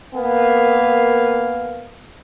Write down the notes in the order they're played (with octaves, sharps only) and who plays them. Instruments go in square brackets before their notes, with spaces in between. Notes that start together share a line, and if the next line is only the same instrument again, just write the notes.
[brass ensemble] A#3 B3 A#4 F5 G#5